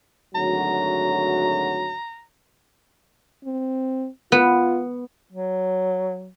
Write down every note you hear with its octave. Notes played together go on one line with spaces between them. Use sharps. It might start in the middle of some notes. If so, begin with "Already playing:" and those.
G#1 D2 F#3 A#5
C4
B3 F4
F#3